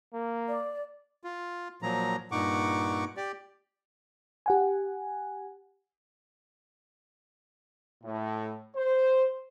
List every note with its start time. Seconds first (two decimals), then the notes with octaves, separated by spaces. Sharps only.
0.13 A#3
0.48 D5
1.23 F4
1.82 A#2 F3 F#3 A#5
2.32 G2 A#2 D#4 F#5 C#6 D6
3.17 G4 D5
4.46 G4 F#5 G#5
8.03 A2
8.76 C5